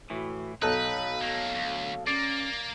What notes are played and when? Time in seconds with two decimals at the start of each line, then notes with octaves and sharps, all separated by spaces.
0.10 A2 E3 F#4
0.62 B1 D#4 A4 B4 F5 F#6
1.22 A3 A#3
1.55 D2
2.07 A#3 C#4 D5